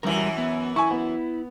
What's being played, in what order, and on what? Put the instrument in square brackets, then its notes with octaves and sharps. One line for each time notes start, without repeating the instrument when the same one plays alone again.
[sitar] F#2 E3 [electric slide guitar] F#3 G3 A#4
[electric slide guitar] B3
[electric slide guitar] E4 [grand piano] G#5 C#6
[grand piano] B3